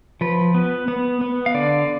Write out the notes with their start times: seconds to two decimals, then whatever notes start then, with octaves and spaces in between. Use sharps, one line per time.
0.21 F3 B4
0.54 B3
0.88 B3
1.21 B3
1.46 F5
1.54 D3 D5